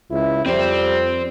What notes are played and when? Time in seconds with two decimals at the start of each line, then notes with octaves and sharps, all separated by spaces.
0.11 C#2 E4
0.46 F2 G3 C4 C5